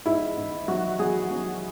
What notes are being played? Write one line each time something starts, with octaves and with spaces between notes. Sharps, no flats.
G#2 E4
G#2
F#3 F#4
F#3 G#4
F#3